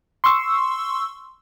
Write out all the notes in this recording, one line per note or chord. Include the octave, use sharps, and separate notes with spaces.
C6 C#6 E6